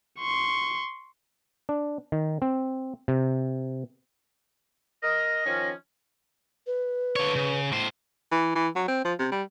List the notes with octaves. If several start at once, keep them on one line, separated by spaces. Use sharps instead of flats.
C6 C#6
D4
D#3
C4
C3
A#4 D#5 A#6
D#3 F3 C#4
B4
D3 C#5
C#3
A2 C5
E3
E3
F#3
C4
F3
C3
G3